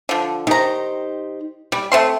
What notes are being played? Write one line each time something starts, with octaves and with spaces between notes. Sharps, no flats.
D3 F3
D#3 D#4 G4 C5 A#5
G3 G5
A3 C4 C6